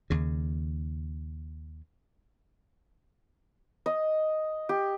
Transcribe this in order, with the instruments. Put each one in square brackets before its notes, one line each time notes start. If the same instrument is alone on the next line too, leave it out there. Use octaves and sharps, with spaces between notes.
[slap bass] D#2 C#3
[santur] D#5
G4